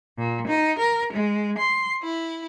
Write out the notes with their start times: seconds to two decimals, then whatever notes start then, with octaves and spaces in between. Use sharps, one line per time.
0.18 A#2
0.46 D#4
0.78 A#4
1.12 G#3
1.57 C6
2.02 E4